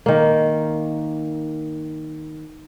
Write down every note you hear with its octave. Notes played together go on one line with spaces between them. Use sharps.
D#3 A#3